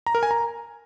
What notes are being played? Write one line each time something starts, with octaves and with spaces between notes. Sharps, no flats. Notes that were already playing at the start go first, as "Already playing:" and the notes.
A#5
A#4
G#5
A#5